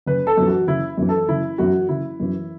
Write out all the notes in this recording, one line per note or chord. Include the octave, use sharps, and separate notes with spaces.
F#1 B4
A4
F#2
E3 F#4
F#1 E4
F#2 E3
A4
F#1 E4
F#2 E3 F#4
F#1 E4
F#2 E3